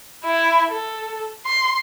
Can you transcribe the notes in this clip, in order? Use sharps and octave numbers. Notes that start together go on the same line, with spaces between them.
E4
A4
C6